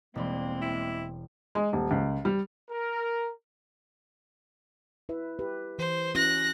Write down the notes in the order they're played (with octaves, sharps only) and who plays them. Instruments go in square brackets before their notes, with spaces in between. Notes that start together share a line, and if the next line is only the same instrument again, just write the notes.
[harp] E1 G3 C6 [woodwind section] G#3 A#3 [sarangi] C4
[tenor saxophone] E4 [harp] G5
[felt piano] G#3
D#1
C#2
G3
[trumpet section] A#4
[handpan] E4 B4 E5
G4 B4
[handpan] E3 [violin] C5
[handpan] C#4 E4 F#4 [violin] F#6 A#6